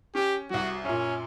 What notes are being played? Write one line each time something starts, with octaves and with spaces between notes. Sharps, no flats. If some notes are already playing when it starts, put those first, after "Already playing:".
C#4 G4
C2 F#3 F#4
F#2 A#2 C#4